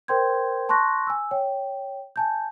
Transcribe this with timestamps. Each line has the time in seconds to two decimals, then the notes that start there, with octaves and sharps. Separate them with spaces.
0.08 A#4 C5 G5 C6 G6 G#6
0.69 A5 C6 C#6 F#6 A#6
1.07 G#5 E6
1.31 C#5 G5
2.16 G#5 A5 G6